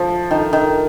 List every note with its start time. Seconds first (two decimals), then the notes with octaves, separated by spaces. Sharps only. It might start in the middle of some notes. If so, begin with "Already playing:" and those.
Already playing: F3
0.31 D#3
0.53 D#3